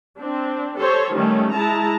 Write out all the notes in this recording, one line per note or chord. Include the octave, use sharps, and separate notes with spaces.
C4 D4
G4 A4 C5 C#5
D#3 G3 A3 C#4
G#3 E4 A5 A#5